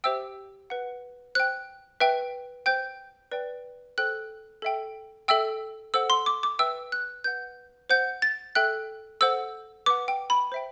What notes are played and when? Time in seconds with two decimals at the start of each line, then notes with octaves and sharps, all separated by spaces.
0.04 G4 C5 E5 G5 E6
0.70 B4 F#5
1.35 C5 G5 F#6
2.00 B4 E5 G5
2.66 C5 G5 G6
3.32 B4 D5 G5
3.98 A4 C5 G5 F#6
4.62 A4 E5 G5
5.28 A4 E5 G5 E6
5.94 A4 C5 F#5 E6
6.10 C6
6.26 D6
6.43 D6
6.59 B4 E5 G5 E6
6.92 F#6
7.24 B4 F#5 G6
7.90 C5 F#5 G6
8.22 A6
8.55 A4 E5 G5 F#6
9.21 A4 C5 F#5 E6
9.86 B4 F#5 D6
10.08 G5
10.30 B5
10.52 C5 E5 G5